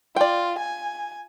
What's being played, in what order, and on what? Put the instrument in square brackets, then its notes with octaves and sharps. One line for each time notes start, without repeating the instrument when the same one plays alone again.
[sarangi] F4 [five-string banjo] D5 G5
[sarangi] G#5